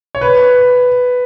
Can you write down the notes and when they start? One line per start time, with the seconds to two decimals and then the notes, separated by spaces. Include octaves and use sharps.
0.15 C#5
0.21 B4